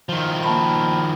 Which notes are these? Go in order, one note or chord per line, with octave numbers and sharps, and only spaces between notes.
D#3 F3
A#3 A5 B5